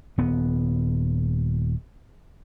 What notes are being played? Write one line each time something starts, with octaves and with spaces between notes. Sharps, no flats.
D#1 B3